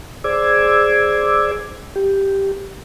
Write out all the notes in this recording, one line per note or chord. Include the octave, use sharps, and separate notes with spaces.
G#4 C5 D5 D6 E6 G#6
G4